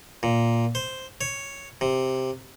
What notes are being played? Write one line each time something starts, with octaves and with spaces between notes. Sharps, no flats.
A#2
C5
C#5
C3